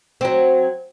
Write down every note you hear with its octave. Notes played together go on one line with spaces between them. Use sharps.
F#3 C4